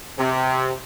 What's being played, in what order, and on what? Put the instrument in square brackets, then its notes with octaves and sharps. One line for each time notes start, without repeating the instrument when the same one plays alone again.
[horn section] C3